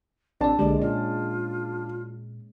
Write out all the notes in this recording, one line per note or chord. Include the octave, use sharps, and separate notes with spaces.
A1 C4 D4 D5 A5
B1 D3 G#3 A#3 G4 D5
A#2 C#4 F4